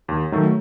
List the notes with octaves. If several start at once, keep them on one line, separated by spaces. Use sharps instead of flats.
D#2
D#3 F#3 A3